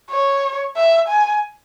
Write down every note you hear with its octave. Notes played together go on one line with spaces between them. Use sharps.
C#5
E5
G#5